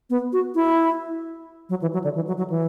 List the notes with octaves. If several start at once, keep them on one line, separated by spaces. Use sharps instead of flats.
B3
F#4
E4
F#3
E3
F#3
D3
E3
F#3
F#3
E3